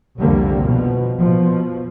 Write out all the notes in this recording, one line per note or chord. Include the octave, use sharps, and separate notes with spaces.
C2 F2 D3 G3 A#3
B2 F3
B2 F3